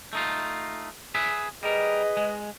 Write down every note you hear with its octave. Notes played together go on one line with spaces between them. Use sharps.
A3 D#4 F4
G#4 B4 E5
G3 G#4 A#4 B4 D#5
G#3